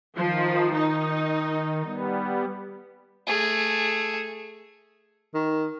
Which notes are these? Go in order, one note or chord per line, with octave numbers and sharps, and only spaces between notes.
D#3 F3
D#4
G3 B3
A3 G#4
D#3